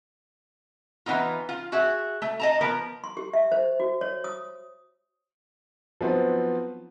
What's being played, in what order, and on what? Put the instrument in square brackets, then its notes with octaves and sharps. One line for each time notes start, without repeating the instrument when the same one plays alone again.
[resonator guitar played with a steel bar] E3 A#3 B3 D#4 F4
F4
F#4 G#4 E5
A3
D#5 A5 A#5
F3 B3 A#4
[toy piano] C6
G4
E5
C5
F#4
C#5
D#6
[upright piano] F3 F#3 B3 C4 D#4 F4